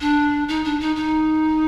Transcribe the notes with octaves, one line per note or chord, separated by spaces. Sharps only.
D4
D#4
D4
D#4
D#4